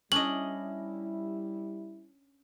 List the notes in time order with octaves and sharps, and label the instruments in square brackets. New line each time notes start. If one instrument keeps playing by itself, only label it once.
[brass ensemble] G3 E4 [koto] C#4 D4 D#5 [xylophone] F#7